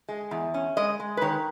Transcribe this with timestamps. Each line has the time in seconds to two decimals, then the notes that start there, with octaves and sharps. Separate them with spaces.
0.08 G#3
0.31 E2
0.54 C#4
0.77 G#3 D#5
1.00 G#3
1.17 B4
1.21 D#3 C#5